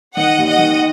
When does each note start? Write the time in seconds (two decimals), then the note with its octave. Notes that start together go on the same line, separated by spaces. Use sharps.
0.16 D#3 D#5 F#5
0.38 D#2
0.48 D#5 F#5
0.59 D#3